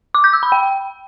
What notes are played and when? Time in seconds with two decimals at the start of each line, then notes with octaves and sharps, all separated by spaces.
0.14 D6
0.24 G6
0.33 E6
0.43 B5
0.52 G5